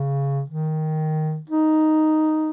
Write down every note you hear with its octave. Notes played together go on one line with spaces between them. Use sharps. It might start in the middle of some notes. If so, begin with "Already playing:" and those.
Already playing: C#3
D#3
D#4